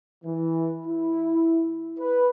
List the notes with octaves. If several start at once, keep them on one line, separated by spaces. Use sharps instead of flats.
E3
E4
B4